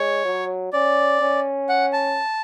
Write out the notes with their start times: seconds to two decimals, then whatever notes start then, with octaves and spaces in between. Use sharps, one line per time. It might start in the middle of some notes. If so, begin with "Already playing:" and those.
Already playing: G#3 C#5
0.25 F#3
0.73 C#4 D5
1.21 C#4
1.69 F#5
1.93 A5